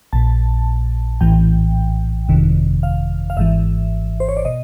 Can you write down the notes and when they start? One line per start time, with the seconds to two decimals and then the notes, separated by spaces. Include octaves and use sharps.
0.13 A#1 A#2 A5
1.21 A#1 A2 E3 G5
2.29 G1 F2 C3 D#3
2.83 F5
3.30 F5
3.37 G#1 G#2 E3 E5
4.20 C5
4.29 C#5
4.37 D5
4.45 B2 D#5